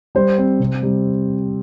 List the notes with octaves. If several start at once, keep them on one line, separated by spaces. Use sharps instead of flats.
G3 C5
C4
C3
G3